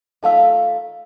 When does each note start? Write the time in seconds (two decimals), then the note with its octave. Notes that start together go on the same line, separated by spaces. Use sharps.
0.23 D#3 A3 F4 E5